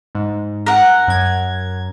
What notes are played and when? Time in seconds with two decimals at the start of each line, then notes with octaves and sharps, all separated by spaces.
0.15 G#2
0.66 A#4 F#5
1.08 F#2 G#6